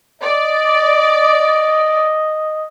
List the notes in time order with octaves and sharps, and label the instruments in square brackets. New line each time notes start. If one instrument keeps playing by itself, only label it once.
[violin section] D5 [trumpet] D#5